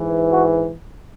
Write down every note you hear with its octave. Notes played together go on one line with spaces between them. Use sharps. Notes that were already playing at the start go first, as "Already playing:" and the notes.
Already playing: G#2 E3
F#4